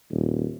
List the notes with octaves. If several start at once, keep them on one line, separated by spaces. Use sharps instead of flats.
D#1